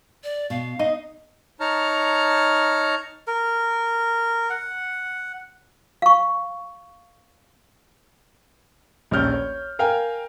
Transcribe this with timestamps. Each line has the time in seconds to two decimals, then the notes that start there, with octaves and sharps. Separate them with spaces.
0.24 D5
0.50 B2 F5
0.79 D#4 D#5
1.60 D#4 C#5 A5 A#5 F6
3.27 A#4
4.50 F#5
6.02 F5 C#6
9.11 A#1 D#2 C#4 F6 G6
9.34 C#5
9.79 A#4 F5 G5 G#5